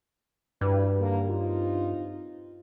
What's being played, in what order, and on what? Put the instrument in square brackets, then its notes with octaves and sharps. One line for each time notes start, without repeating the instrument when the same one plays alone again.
[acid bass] G2 [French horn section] E3 F#4 B4
[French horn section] D3 D#3 A#3
C4 D#4 F4